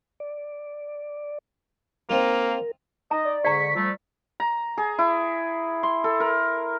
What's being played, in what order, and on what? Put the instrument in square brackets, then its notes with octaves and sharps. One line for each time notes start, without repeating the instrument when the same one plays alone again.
[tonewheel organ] D5
[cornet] A#3 [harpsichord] C4 D#4 F4 [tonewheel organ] A#4
[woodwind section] D#4 D#5 [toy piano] A#5
[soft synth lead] D5
[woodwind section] G#2 D3 C#6 [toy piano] D5 A#5 [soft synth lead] B6
[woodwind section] F3 G3 A3
[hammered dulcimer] A#5
G#4
E4
C6
A4
A#4